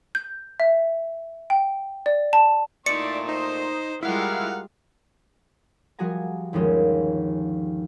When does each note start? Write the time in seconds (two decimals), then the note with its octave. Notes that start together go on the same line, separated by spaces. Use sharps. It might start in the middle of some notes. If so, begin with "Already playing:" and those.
0.15 G6
0.60 E5
1.50 G5
2.06 D5
2.33 A5
2.86 A#2 A3 D#4 E4 D5 C6 C#7
3.29 D#4 C5
4.03 G3 G#3 E4 F4 A#4 F5 F#5
5.99 F3 G3 F#4 G#4 G#5 A#5
6.53 G1 D#2 F3 G#3 C#4